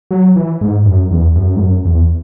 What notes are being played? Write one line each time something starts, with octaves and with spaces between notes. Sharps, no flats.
F#3
E3
G#2
F#2
E2
F#2
G#2
F#2
E2